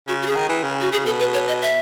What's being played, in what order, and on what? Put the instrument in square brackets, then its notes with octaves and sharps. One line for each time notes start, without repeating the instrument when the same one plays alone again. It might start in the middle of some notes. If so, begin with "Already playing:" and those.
[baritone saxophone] C#3 [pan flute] F#4
[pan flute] F#4
[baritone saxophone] C#3 [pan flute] G#4
[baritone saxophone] D#3
E3
C#3
[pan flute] F#4
[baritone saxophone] C#3 [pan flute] G#4
[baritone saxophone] B2 [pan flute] A4
[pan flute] B4
C#5
D#5
E5